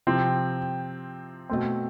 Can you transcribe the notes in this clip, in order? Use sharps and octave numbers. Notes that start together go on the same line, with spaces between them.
C3 F3 C4
B2 A3 C4